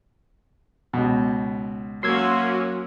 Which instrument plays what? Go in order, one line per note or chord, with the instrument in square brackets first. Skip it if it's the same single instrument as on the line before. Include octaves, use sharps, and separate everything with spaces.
[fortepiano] C#2 B2
[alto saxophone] F#3 [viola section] A#3 C#4 F#4 [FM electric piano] C6 E6 G#6